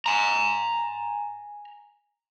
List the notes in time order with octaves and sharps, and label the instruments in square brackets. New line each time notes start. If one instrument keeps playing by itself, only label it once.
[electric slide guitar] G#5 A#5